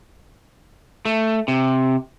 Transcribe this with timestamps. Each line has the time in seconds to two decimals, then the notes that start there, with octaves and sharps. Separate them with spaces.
1.05 A3
1.48 C3